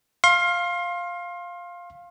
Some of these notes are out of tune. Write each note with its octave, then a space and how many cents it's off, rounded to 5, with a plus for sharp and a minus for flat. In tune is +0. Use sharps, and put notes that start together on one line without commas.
F5 +0 C6 +30